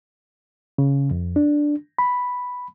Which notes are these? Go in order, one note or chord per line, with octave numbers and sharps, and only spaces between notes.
C#3
F2
D4
B5